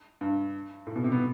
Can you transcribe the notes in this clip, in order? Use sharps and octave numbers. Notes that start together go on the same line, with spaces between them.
G2
A2
B2
C3
B3